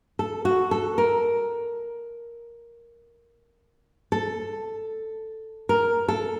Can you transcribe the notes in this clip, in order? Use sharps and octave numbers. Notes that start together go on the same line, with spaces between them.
A4
F#4
A4
A#4
A4
A#4
A4